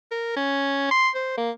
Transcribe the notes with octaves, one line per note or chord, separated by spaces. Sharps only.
A#4
C#4
C6
C5
A#3